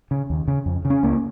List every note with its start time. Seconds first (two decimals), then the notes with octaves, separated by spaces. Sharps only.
0.11 C#3
0.30 D#2
0.48 C#3
0.66 F2
0.85 C#3
0.90 C#4
1.03 C#2 A#3